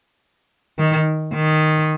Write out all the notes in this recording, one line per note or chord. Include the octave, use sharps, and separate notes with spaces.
D#3
D#3